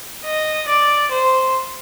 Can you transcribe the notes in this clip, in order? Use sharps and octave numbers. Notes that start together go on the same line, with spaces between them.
D#5
D5
C5